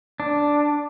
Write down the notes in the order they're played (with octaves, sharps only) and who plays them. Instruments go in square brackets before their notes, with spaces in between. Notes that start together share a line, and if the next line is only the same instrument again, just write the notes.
[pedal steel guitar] D4